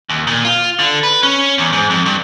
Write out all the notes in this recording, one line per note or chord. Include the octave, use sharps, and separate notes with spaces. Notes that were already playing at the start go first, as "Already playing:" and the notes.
D#2
A#2
F4
D3
B4
C#4
E2
G#2
F2
G2